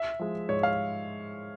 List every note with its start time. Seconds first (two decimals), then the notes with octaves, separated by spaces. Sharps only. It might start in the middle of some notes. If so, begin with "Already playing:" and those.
Already playing: E5
0.19 F3 G#3
0.49 G#2 C#5
0.63 F5